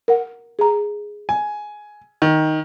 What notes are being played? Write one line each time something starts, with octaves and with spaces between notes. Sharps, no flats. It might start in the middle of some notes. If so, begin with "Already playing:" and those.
A#4 F#5
G#4 A#5
G#5
D#3